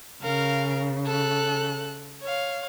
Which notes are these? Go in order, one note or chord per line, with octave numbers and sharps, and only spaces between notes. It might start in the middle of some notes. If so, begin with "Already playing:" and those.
C#3 A#4 F5
A4 F#6
C#5 F5